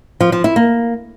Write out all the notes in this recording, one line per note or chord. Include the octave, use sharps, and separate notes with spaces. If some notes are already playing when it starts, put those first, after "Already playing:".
F3
F3
E4
A#3